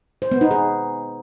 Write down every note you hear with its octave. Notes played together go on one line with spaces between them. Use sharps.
C5
B3
D#4
G#4